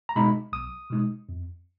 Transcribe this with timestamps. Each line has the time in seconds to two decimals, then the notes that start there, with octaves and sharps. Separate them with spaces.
0.09 A#5
0.16 B2 G#3 D#4 B5
0.52 B1 D#6
0.90 B2 G#3 D#4
1.29 F2